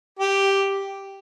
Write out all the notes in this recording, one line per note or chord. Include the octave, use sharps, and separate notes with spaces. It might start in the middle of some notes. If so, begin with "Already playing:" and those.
G4